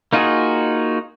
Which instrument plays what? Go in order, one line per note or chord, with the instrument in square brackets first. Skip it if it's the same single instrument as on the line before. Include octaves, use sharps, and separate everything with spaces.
[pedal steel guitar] A#3 D#4 F4 F#4 G#4